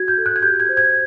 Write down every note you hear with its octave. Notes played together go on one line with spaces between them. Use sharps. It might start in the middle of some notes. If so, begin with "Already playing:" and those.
Already playing: F#4 G#6
G6
A4
F#6
G#6
G4 G6
G#6
C5
G#6